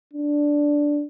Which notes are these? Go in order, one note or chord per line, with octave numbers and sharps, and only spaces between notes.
D4